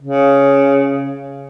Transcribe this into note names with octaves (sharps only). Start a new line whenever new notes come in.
C#3